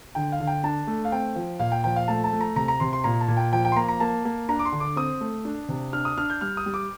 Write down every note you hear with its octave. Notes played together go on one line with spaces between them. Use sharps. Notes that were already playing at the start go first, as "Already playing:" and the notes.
D3 G5
F5
D3
G5
D4 A5
A3
F5
C4 G5
F3
A#2 F5
G5
F3 G5
F5
A3 A5
A5
A3
A#5
C3 A#5
A#5
C3 C6
C6
A#2 A#5
A5
A#2
G5
F3 G5
G5
C6
A#3 A#5
A#5
A#3 A5
A#3
D4 A#5
D6
C6
D3
D6
C4 D#6
A3
D4
C3
D4 F6
D#6
D4 F6
G6
G3 F6
D#6
G3
D6